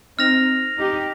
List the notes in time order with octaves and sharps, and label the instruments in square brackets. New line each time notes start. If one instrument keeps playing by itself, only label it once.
[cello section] C4 D#4 [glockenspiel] F6 A#6 F7
[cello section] D#4 G4